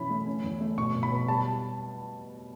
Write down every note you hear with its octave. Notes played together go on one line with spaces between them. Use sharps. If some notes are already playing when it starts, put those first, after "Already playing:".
Already playing: B2 E3 C#4 B5
A3
C#4
E2
A3
B2 C#6
B2
B5
B2
G3 A5